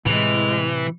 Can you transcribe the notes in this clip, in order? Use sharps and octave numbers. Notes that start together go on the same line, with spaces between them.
A2 C3 E3 G#3 F7